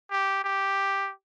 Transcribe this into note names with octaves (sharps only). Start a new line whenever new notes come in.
G4
G4